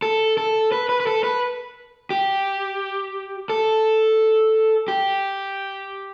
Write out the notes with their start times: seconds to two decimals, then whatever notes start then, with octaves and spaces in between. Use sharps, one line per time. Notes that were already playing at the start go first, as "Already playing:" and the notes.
0.02 A4
0.38 A4
0.72 B4
0.89 B4
1.00 B4
1.07 A4
1.24 B4
2.10 G4
3.50 A4
4.88 G4